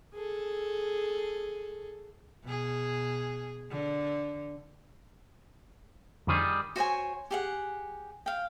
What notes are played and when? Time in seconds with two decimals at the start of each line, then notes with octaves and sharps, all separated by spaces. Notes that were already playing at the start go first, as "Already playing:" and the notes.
0.14 G#4 A4
2.44 B2 G#4
3.69 D3
6.27 F2 D3 D#3 G3 G#4
6.76 F#4 C5 C#5 G#5
7.31 G4 G#4 F#5
8.26 F5 G5